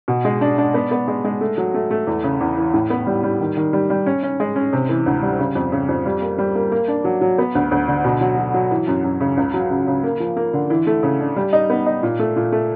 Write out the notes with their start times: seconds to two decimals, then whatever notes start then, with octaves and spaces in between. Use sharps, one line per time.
0.08 B2
0.25 G#3
0.41 D4
0.58 D4
0.74 B3
0.91 B3
1.08 G#3
1.25 G#3
1.41 A3
1.58 F#3
1.74 A3
1.91 A3
2.07 E2
2.23 C#3
2.40 E2
2.57 E3
2.74 A2
2.90 B3
3.07 G3
3.23 G3
3.40 D#3
3.57 D#3
3.73 G3
3.90 G3
4.06 C#4
4.23 C#4
4.40 G#3
4.56 C#4
4.73 C3
4.89 E3
5.06 D2
5.22 G3
5.39 C#3
5.55 F2
5.72 C#3
5.89 F2
6.06 G3
6.22 A#3
6.38 G3
6.55 A#3
6.72 A#3
6.88 D4
7.04 F#3
7.21 F#3
7.38 B3
7.55 D2
7.71 D2
7.88 D3
8.04 B2
8.21 F#3
8.38 F#3
8.54 F#3
8.71 E3
8.88 F#2
9.04 F#2
9.21 C#3
9.37 C#2
9.54 F#3
9.70 C#3
9.87 C#3
10.03 A#3
10.20 F3
10.36 A#3
10.53 D3
10.70 E3
10.87 A3
11.03 C#3
11.20 D4
11.36 G3
11.53 D#4
11.70 B3
11.86 D#4
12.03 A#2
12.19 A3
12.36 A#2
12.52 A3